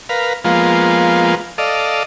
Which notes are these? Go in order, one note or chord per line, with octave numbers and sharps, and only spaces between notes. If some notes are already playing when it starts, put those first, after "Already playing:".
A#4 B4 F5
F3 G#3 A#3 B3 F4
A4 D5 D#5 F5